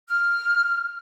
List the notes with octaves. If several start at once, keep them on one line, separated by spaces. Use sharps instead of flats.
F6